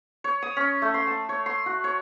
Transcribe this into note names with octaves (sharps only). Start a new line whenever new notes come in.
C#5
D#6
C#4
A3
C6
A5
C#5
C6
F#4
C#5